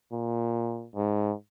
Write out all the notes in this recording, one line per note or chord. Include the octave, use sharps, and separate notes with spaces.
A#2
G#2